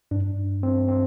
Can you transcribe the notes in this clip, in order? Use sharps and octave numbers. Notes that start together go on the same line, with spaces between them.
G2 D4
C4
C4